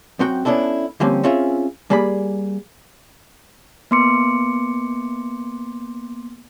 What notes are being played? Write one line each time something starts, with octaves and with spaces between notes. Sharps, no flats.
F#2 C4 F#4 G5
B3 C#4 D4 E4 A4
D3 F3 G3 A#3 C4 C#4
C4 C#4 F4 G#4 E5
G3 A#3 G#4 D5 B5
A#3 B3 C6 D6 C#7